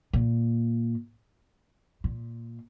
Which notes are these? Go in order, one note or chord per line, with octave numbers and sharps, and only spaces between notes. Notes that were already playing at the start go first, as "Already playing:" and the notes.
A#2
A#2